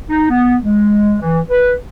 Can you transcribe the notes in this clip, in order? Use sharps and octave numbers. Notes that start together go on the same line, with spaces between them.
D#4
B3
G#3
E3
B4